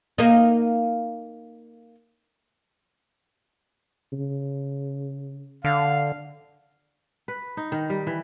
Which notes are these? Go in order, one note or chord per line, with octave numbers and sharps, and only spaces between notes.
A#3 D#4
C#3
D3 F5
B4
D#4
D#3
G3
E3